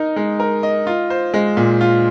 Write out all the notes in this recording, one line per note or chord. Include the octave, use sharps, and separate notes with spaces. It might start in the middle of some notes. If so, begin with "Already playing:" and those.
Already playing: D#4 A#4 D#5
G#3
A#4
D#5
F4
C5
G#3
A#2
F4